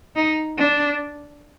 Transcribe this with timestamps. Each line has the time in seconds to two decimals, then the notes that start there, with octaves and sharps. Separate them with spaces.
0.16 D#4
0.58 D4